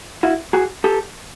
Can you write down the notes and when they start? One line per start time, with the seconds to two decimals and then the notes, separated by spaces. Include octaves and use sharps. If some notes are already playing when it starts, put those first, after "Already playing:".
0.23 E4 F#4
0.53 F#4 G#4
0.84 G4 A4